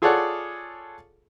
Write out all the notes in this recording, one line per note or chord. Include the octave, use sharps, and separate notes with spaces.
F4 G#4 A4 C#5 D5 F#5